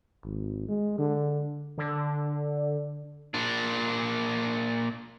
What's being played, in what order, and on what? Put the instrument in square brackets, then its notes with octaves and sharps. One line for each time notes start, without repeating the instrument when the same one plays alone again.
[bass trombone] G#1
G#3
D3
[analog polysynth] D3
[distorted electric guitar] A#2 D4